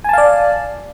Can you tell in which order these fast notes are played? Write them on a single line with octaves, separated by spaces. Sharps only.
G#5 A5 F5 D5